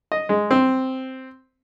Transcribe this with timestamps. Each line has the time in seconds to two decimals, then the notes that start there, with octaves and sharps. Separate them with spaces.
0.12 D#5
0.29 G#3
0.51 C4